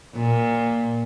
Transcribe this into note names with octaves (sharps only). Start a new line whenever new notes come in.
A#2